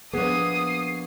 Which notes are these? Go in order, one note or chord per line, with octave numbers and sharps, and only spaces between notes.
A#1 B3 G#4 D#6 C7